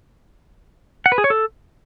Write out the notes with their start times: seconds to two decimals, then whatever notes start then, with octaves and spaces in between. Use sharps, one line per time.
1.06 F#5
1.12 B4
1.18 G#4
1.24 C#5
1.30 A4